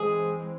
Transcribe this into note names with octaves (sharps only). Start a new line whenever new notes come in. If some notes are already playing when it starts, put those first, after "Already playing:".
Already playing: E3 G#3 C4 G#4